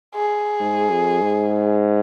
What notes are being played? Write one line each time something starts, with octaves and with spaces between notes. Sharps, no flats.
G#4
G#2
F2
G#2